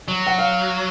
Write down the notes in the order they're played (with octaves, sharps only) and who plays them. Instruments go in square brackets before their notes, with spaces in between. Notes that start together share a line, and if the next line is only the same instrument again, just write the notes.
[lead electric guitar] F#3
[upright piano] F#5
F5